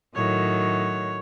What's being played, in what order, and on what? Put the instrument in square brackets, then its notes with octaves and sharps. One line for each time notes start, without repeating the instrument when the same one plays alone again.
[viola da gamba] A2 D#3 F#3 [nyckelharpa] C#5